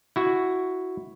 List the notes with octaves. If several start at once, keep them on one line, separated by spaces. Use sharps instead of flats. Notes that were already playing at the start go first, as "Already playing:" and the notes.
E4 F#4